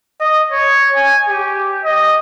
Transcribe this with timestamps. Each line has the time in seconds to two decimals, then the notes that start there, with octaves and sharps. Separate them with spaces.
0.21 D#5
0.52 C#5
0.96 G#5
1.29 G4
1.84 D#5